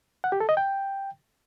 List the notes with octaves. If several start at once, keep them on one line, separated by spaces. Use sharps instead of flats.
F#5
G4
A4
D#5
G5